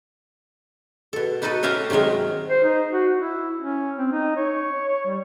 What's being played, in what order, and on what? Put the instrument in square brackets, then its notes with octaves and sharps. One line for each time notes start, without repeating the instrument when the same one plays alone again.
[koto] B2 A4
B3 D#4 F#4 A4 B4
C#4 G4 A#4 E5 F5 A#5
C3 D#3 F#3 G#3 A#4
[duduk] C5
D#4
F#4
E4
C#4
C4
D#4
C#5
G3